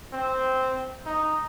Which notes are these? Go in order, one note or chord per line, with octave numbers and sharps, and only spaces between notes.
C4
D#4